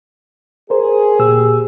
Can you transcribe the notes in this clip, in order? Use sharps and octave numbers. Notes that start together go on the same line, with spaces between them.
G#4 A#4 C5
A#2 G4 E6